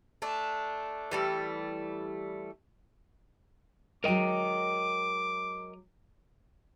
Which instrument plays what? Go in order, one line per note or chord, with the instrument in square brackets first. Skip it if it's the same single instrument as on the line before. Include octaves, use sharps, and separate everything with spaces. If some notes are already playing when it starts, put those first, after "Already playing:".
[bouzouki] A3 D4
E3 G3 A3
[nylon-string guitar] F#3 G#3 [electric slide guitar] A#4 D#5 G5 [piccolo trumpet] D6